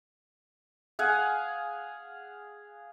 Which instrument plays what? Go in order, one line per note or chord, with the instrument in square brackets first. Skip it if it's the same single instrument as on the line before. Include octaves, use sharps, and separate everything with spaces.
[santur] G#4 F5 F#5 G#5